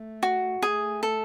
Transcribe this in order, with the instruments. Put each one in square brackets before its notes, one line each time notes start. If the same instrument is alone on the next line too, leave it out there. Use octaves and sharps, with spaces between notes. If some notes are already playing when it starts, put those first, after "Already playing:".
Already playing: [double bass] A3
[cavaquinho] F#4
[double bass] A3 [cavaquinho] G#4
[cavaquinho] A4